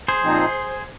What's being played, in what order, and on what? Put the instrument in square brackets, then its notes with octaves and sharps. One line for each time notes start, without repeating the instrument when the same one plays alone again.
[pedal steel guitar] G#4 C5
[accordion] A#2 F3 C4 D#4